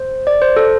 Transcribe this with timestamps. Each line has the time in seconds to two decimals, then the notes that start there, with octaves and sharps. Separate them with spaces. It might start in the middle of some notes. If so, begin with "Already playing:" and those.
Already playing: C5
0.27 D5
0.42 C5
0.56 A4